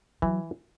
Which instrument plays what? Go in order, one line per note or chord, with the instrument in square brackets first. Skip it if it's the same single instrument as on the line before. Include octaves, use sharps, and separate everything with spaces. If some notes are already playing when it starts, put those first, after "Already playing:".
[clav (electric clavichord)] E3 [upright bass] F#3